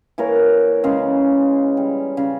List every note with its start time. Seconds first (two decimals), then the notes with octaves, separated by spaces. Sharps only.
0.18 E3 A#3 A#4 C#5
0.84 C#3 G#3 C#4
1.77 G3
2.17 C#3